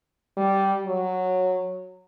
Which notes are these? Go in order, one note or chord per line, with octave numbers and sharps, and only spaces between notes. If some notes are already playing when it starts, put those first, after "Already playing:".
G3
F#3